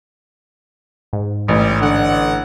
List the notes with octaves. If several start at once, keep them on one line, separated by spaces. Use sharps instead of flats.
G#2
A1 G3
D3 F#5